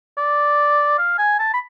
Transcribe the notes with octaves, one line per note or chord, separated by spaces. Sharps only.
D5
F5
G#5
A5
B5